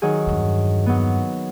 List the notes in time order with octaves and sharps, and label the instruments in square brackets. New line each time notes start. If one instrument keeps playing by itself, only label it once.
[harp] D#3 F#3 G#4
[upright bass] E2 G2
[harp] F#3 B3